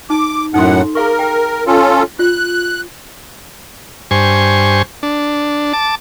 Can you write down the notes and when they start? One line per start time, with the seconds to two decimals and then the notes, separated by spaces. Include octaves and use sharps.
0.10 D#4 A5 D6
0.54 F#2 A2 D#4 A4 F#5 C6
0.95 G#4 A#4 F5 C#6
1.19 G5
1.67 C#4 F4 A4
2.19 F4 F#6
4.11 G2 C5 G#5 C#6
5.03 D4
5.73 A5 D6